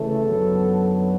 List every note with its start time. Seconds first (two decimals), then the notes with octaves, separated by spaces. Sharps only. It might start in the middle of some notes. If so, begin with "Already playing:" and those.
Already playing: C#3 E3 A3 A4
0.26 F#2 D3 F#3 B3